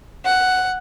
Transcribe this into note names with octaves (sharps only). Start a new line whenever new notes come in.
F#5